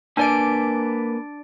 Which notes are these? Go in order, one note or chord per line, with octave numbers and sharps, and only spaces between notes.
A#3 D4 B4 D5 G#5 D7